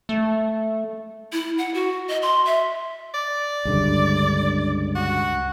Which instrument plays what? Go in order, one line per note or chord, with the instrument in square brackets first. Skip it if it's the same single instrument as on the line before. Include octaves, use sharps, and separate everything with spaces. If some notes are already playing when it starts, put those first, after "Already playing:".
[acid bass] A3
[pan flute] E4
F#5
F#4
D#5
C6
E5
[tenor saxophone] D5
[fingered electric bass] C#2 G2 D3
[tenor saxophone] F#4